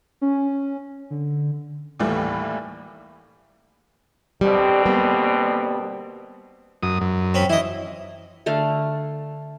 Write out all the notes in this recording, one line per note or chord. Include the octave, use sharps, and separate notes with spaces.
C#4
D3
D#2 A2 E3 G3 A3
B2 D3 G3 C4
G3 A#3 B3
F#2 D#6
F#2
C4 C#4 B5
E3 E4 D#5
D3 A3 F5